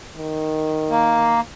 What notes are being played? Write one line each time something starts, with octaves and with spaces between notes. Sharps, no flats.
D#3
A#3